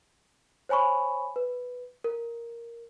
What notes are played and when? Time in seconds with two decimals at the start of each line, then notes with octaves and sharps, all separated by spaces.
0.69 C5 C#5 G#5 B5 C#6
1.36 B4
2.04 A#4